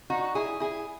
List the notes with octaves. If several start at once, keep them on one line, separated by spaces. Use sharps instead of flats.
D#4 F#4
E4 G#4
E4 G#4